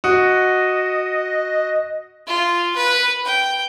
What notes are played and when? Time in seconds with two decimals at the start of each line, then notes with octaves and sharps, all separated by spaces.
0.04 F#4 D#5
2.27 F4
2.76 B4
3.25 G5